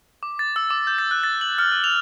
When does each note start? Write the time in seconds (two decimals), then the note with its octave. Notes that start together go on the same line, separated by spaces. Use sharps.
0.23 D6
0.39 A6
0.56 E6
0.70 D6
0.87 G6
0.98 A6
1.11 F#6
1.24 A6
1.41 F#7
1.58 F6
1.72 F#6
1.84 F7